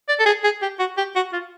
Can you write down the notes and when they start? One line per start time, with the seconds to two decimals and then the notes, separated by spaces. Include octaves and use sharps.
0.09 D5
0.20 A4
0.26 G#4
0.44 G#4
0.62 G4
0.79 F#4
0.97 G4
1.15 F#4
1.33 F4